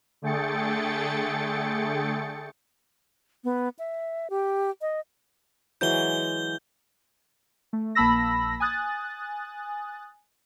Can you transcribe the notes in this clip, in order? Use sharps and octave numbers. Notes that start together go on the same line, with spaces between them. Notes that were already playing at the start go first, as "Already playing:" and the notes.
D3 A3 G#4 G5 A6 C#7
B3
E5
G4
D#5
E3 F#3 G#3 G6 G7
A3
A#1 A#3 A5 B5 E6 A#6
G#5 D#6 F#6 A6